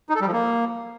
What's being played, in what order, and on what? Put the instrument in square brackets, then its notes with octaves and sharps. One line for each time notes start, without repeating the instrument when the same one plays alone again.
[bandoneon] D#4
A4
G3
F3
A#3